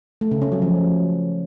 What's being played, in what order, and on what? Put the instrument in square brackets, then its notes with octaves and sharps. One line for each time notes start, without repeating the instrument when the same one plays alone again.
[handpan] A3
C#3
C#4
F#3
F3